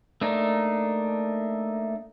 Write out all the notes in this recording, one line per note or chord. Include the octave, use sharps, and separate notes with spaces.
A3 A#3 D4 D#4